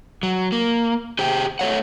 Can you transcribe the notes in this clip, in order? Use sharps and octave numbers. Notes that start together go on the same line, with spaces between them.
F#3
A#3
G4 G#4 C5 G5
A3 C#5 F#5